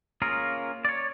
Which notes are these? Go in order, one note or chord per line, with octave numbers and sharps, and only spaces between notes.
A#3 C#4 F4 G#4 A#4
C#5 D5